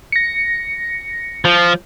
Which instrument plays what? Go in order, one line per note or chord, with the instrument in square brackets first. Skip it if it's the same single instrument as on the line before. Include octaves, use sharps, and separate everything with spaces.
[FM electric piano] A#6 C#7
[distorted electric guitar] F3